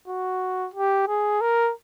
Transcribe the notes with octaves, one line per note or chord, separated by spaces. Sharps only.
F#4
G4
G#4
A#4